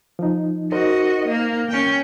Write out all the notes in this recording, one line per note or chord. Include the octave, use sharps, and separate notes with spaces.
F3 D#4
D#4 F#4 A#4 C5 D#5
A#3
A#3 C#4 G5